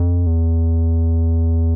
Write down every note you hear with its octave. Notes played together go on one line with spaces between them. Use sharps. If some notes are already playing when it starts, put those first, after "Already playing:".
Already playing: F2
E2